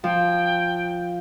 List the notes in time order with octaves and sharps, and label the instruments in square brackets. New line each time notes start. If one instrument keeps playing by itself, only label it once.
[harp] F3 [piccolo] G5